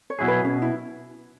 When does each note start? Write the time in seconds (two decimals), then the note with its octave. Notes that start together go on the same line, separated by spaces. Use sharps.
0.10 C#5
0.19 B2 F#3 E4 G#4
0.28 B4
0.44 B2 C#4
0.62 E4